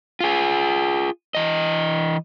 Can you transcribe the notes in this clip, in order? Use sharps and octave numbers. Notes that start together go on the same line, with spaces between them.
F4 G#4
E3 D#5